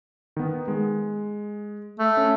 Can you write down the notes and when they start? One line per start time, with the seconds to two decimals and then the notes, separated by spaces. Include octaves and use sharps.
0.37 D#3 B3
0.68 G#3
1.99 A3
2.17 C#4